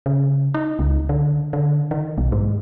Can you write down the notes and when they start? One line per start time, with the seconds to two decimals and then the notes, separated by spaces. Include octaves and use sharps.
0.06 C#3
0.54 D#4
0.79 C#2
1.09 D3
1.53 D3
1.91 D#3
2.18 B1
2.32 G#2